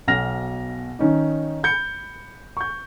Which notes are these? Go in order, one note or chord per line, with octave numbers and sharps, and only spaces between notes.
B1 B2 F6 A#6 F7
D#3 C#4 D#4
B5 G6 C#7
C#6 G6